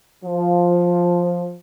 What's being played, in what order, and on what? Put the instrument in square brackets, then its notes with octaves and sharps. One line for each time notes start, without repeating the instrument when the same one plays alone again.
[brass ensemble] F3